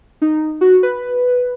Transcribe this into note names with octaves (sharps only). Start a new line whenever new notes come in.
D#4
F#4
B4